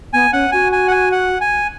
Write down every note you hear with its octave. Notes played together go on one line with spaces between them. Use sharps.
B3 G#5
C#4 F#5
F#4 G#5
G#5
F#5
G#5
F#5
G#5